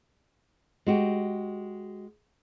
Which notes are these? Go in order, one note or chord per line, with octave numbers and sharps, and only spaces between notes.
G#3 F#4 G4